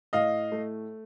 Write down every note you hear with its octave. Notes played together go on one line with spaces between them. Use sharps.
A2 D#5 F5
A3